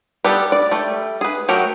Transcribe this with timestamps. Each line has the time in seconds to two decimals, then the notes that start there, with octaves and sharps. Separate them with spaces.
0.24 G3 B3 G4 A4 B4
0.52 D5
0.71 G3 A3
1.21 G#4 B4
1.49 F#3 A3 F#4 G4 A#4